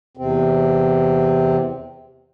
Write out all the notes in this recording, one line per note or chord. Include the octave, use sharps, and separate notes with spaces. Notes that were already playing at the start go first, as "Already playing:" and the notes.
E2 C3 C4